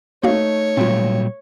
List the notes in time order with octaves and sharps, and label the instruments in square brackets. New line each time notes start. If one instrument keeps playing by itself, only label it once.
[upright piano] A3 D#4 [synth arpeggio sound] A#3 F#4 F5 [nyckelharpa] C#5
[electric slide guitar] A#2 F#3 G3 [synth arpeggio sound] C4 F4